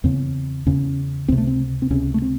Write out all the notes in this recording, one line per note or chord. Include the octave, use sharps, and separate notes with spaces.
E2 C#3 C4
E2 C#3 C#4
C#2 C3 C4
A3
C4
C4
C#2 C3 C#4
A3
C4